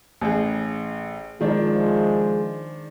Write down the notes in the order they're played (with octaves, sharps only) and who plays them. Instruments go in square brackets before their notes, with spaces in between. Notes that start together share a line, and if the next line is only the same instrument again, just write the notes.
[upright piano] A1 G#4
[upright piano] D#3 D4 [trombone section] F3 G#3